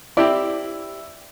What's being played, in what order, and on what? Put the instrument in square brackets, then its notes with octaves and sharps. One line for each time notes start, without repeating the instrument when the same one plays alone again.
[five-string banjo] C4 G4 D5 [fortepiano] E4